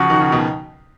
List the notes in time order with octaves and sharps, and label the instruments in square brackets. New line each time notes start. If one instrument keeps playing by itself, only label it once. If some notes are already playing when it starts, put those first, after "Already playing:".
Already playing: [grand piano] C#3 F3 [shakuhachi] F#4
[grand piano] D#3
C#3
B2 D#3